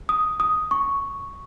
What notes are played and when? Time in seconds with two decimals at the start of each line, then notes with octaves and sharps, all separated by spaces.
0.09 D#6
0.40 D#6
0.71 C#6